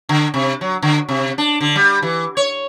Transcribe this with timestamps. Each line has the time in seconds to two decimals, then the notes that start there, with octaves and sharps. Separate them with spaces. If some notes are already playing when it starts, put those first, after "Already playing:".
0.09 D3
0.34 C3
0.61 F#3
0.82 D3
1.09 C3
1.38 D4
1.61 D3
1.76 G3
2.02 E3
2.37 C#5